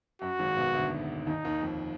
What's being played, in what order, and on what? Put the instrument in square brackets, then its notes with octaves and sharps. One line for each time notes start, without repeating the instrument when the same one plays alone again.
[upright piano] F#2 [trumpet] F#4
[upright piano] G#1 G#2
B1 B2
D2 D3
[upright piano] D#2 D#3 [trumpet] D#4
[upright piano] D#2 D#3
F2